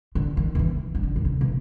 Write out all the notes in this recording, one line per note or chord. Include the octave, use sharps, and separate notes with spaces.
D3
D#3
D#3
E3
D#3
D3
D3
C#3
B2